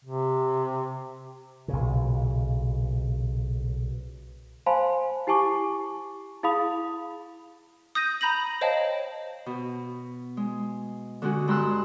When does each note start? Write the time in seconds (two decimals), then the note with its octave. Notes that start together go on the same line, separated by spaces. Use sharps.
0.05 C3
1.68 B1 A#2 C#3
4.66 C5 F5 G#5 A5 B5 C6
5.27 E4 G4 G#5 A5 C#6 D6
6.43 E4 G#4 F5 B5 D#6 F7
7.95 D#6 G6 A#6 D#7
8.21 A#5 B5 G6 A#6 F#7
8.61 C5 C#5 D#5 F5 G5 A5
9.46 B2
10.37 G#3
11.22 D3 G#3 C#4 F#4
11.48 G2 G#3 A#5 C6 E6 F#6